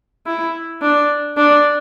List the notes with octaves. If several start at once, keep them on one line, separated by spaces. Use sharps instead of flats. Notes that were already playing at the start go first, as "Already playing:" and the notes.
E4
D4
D4